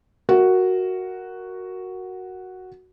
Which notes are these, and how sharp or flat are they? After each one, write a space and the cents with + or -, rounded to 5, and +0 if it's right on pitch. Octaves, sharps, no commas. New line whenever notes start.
F#4 +0 A#4 -5 E5 +0